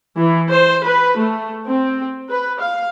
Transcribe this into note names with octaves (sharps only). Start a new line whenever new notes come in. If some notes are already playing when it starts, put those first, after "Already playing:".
E3
C5
B4
A3
C4
B4
F5